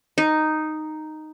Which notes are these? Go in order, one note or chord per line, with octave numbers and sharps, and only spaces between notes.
D#4